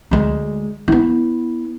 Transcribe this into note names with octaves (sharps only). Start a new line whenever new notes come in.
D2 G#3
B3 E4